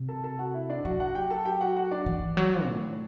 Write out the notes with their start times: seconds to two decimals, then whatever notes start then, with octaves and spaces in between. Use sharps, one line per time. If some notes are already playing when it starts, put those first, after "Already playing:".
Already playing: C3
0.08 A4 A5
0.24 A4 A5
0.39 F#4 F#5
0.54 E4 E5
0.70 D4 D5
0.85 F#3 F#4 F#5
1.00 F#4 F#5
1.15 G4 G5
1.30 A4 A5
1.45 G4 G5
1.61 F#4 F#5
1.76 F#4 F#5
1.91 D4 D5
2.06 E3
2.37 F#3
2.68 A2